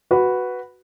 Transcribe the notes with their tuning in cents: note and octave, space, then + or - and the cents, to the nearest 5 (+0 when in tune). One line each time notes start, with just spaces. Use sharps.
F#4 +0 B4 +0